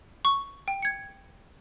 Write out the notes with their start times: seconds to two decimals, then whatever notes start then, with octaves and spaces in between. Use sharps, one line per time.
0.25 C#6
0.68 G5
0.82 G#6 C#7